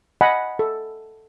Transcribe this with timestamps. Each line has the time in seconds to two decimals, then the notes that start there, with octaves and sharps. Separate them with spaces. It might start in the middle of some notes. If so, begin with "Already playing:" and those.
0.21 D#5 F#5 G#5 B5
0.59 A4